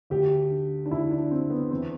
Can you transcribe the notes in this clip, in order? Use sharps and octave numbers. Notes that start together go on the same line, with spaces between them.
D2 G4
D3
D4
D2 E4
D4
D3 C4
B3
E2 C4